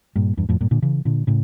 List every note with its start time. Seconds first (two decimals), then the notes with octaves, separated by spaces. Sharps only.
0.16 G2 A#2
0.37 E2 G2
0.49 F2 A2
0.61 G2 A#2
0.71 A#2 D3
0.82 C#3 E3
1.05 A#2 D3
1.27 A2 C#3